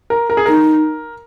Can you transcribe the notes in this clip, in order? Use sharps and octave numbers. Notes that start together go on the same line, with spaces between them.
A#4
A#4
G#4
D#4 A#4